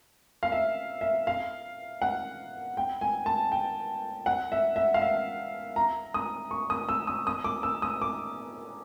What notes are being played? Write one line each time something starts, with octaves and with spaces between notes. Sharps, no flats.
F5
E5
E5
F5
F#5
G5
G#5
A5
G5
F#5
E5
E5
F5
E5
A#5
D#6
C#6
D#6
E6
D#6
D#6
D6
E6
D#6
D6